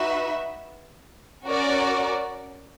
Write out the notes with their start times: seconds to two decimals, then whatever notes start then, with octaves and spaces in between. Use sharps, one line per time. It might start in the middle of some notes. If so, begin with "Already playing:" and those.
Already playing: D#4 F#4 B4 E5
1.46 C#4 F#4 A#4 D5 F#5